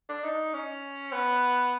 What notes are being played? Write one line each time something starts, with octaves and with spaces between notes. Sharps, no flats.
D4
D#4
C#4
B3